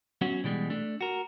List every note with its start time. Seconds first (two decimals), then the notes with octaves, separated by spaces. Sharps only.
0.21 F#3 B3 C#4 F#4
0.44 B2 E3 G3 G#3
0.70 A3 D4
1.01 F#4 A#4